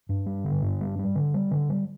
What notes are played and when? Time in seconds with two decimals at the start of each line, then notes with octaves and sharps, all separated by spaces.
0.09 G2
0.26 G3
0.45 D3
0.62 G2
0.81 G3
0.99 G3
1.15 D3
1.34 G3
1.51 D3
1.69 G3